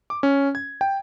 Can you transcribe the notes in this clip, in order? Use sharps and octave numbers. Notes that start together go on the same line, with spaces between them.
D6
C#4
G#6
G5